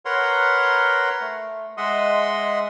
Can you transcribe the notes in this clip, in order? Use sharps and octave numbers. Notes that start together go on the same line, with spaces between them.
A#4 B4 C#5 F#5 A#5 C6
A3
G#3 D#5 E5 F#5 C6 D#6